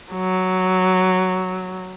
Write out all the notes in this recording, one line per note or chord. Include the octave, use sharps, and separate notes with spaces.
F#3